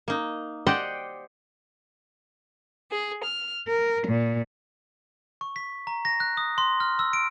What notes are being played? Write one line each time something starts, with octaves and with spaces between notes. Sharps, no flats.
A#3 D#4
G4 C5 D5 D#5 F#5 G5
G#4
F6
A#4
A#2
C#6
B6
A#5
A#6
F#6
D#6
C6
F6
E6
D7